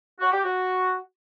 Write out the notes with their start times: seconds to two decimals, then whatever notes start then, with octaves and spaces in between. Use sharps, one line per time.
0.20 F#4
0.32 G4
0.43 F#4